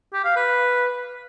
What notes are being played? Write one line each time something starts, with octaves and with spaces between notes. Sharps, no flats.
G4
F5
B4